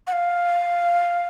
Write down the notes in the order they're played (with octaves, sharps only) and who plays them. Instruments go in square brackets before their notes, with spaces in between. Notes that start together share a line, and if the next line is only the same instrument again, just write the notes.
[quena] F#5
F5